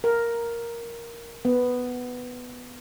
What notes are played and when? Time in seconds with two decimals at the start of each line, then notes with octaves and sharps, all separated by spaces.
0.04 A#4
1.45 B3